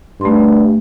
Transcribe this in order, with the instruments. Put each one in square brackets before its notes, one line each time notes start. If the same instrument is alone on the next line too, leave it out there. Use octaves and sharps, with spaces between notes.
[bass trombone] G2 [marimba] A3 B5 C6